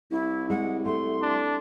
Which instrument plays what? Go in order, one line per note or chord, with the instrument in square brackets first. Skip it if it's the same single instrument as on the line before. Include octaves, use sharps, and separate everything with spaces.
[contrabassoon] C2 [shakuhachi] E4
[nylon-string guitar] G#3 [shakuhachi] F#5
[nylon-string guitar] A3 [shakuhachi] C6
[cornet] D4